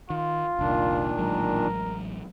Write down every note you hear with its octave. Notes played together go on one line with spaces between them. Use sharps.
D#3 F4
F1 C2 A#2 D#3 D4
A1 F#3 G#3 A#4